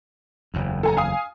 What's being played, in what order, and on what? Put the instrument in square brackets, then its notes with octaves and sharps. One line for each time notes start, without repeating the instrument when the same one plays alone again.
[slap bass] F#1 E2
[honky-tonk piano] A4 G#5 A#5
F5 G#5 D#6